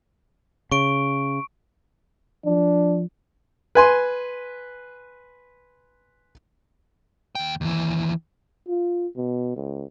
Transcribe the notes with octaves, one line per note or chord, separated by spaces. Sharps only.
C#3 C#6 D7
F3 D4
B4 G#5 C6
D#2 G5
D#2 E3
F4
B2
C#2